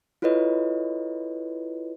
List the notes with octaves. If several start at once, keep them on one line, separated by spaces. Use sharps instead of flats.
E4 F4 A4 B4 C#5 D#5